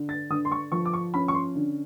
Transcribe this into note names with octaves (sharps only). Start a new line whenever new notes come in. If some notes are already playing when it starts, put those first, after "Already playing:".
Already playing: D3
A6
D3 D#6
C6
C#6
F3 C#6
D6
C#6
C#4 B5
C#6
C6
D3